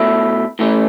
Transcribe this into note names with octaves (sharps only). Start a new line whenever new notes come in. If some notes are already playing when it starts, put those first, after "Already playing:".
Already playing: B2 A3 E4
A2 E3 A3 C#4